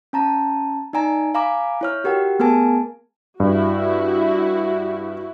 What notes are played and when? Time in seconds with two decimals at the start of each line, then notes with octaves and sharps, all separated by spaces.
0.13 C#4 A5 A#5
0.93 D#4 D5 G#5 A#5
1.35 F5 G#5 A#5 B5 D6
1.81 E4 C#5 F6
2.04 F#4 G4 A#4 F#5 G5
2.39 A3 B3 G#4 A#4 G#5 A5
3.40 G2 E4 F#4